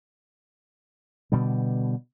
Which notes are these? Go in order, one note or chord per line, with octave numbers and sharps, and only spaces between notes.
B2 D3 G3